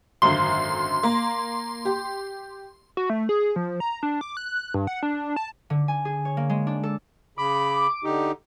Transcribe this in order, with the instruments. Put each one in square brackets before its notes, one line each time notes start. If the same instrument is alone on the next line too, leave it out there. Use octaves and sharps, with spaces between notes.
[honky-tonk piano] G#1 F#2 D3 [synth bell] C6
[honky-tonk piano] A#3
G4
[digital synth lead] F#4
A3
G#4
F3
A#5
D4
D6
F#6
G2
F#5
D4
A5
[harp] D3
G#5
G#4
C#5
A#3
G#3
D4
A4
[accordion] C#3 B5 [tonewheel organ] D6
[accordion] D3 D#4 G4